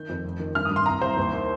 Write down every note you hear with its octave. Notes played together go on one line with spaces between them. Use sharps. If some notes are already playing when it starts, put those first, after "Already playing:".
Already playing: D#3 G6
F2
F1
D#3
G2 F6
D#6
G2
C6
C2 A#5
C2 C5
D#2
D#3